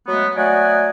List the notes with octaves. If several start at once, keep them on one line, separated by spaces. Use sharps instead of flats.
F#3 G#3 A3 B3
F#3 A3 D5 D#5 F#5 G#5